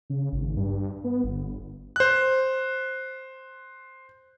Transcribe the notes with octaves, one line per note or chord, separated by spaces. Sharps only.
C#3
G#1
G2
B3
G1
C5 F#6